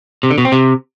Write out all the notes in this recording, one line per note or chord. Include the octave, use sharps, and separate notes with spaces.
C3
D3
B2
C4
C3